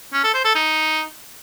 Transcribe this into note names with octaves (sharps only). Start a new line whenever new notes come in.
C#4
A4
C5
A4
D#4